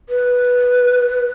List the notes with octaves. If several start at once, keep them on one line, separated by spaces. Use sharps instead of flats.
B4